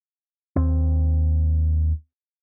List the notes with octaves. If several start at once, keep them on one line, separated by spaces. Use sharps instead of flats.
D#2 C4